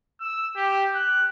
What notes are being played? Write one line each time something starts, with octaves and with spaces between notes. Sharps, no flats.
E6
G4
F#6